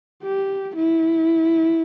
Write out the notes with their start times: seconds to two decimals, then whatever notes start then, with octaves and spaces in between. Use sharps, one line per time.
0.23 G4
0.75 E4